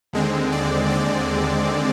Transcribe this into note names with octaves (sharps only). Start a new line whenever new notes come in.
D#2 D3 G#3 C4
D5
D5